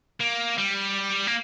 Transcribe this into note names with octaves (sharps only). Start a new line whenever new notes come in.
A#3
G3
A#3